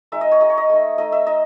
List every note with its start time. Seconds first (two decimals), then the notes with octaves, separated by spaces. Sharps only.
0.12 G#3 D#4 E5
0.21 D#5
0.32 C#5
0.40 G#3 D#4 D#5
0.49 C#5
0.58 D#5
0.69 A3 D#4
0.98 A3 D#4 D#5
1.12 E5
1.26 D#4 D#5